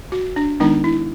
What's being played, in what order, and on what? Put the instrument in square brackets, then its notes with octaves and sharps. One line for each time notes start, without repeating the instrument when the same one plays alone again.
[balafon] F#4
D4
D#3 G#3 B3 D4 D#4
E4